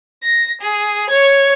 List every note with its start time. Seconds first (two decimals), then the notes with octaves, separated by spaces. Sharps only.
0.24 A#6
0.61 G#4
1.09 C#5 G#6